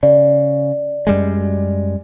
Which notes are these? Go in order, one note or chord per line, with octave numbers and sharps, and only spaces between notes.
C#3 D5
F#2 G3 G#3